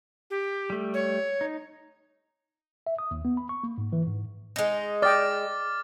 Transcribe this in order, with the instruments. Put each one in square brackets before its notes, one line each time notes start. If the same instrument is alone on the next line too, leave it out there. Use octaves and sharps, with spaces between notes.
[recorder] G4
[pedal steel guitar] G3 A3
[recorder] C#5
[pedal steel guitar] D#4
[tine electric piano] E5
D#6
D#2
B3
B5
C#6
A#3
G#2
E3
G#2
[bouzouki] G#3 D#4
[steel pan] D5 D#5 G5 [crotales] D6 F6 A6